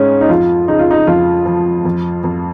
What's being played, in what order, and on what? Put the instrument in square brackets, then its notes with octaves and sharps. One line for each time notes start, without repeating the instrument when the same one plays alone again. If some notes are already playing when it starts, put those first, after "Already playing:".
Already playing: [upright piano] G#2 G#3 [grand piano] C#4
[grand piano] D#4
[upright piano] F2 [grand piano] F4
[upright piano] C#3 [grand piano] D#4
[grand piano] F4
D#4
[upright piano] F2 [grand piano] F4
[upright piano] F3
F2
F2